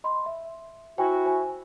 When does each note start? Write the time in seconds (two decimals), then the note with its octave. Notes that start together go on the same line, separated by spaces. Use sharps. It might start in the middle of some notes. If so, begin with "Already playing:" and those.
0.04 D#5 B5 C6
0.26 E5
0.98 E4 F#4 C5 G5 G#5
1.26 C5 G#5